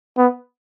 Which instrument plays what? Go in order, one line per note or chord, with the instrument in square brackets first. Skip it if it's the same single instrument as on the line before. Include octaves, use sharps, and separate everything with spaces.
[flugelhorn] B3